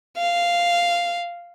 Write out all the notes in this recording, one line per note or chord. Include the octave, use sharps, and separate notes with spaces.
F5